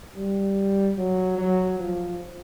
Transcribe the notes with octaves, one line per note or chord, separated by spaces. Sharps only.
G3
F#3
F#3
F3